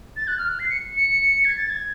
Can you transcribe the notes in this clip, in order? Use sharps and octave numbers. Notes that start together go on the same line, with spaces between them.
A6
F#6
F6
F#6
C7
C#7
C#7
G#6
A6
G#6